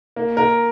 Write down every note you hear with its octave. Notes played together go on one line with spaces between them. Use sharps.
A#3
A#4